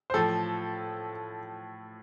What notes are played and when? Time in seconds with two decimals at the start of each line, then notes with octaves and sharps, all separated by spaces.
0.10 C5
0.14 A2 F3 A4